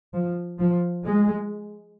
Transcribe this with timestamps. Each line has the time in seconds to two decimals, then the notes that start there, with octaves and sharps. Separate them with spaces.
0.14 F3
0.59 F3
1.04 G#3